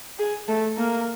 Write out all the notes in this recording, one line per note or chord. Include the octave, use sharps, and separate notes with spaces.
G#4
A3 A4
A#3 A#4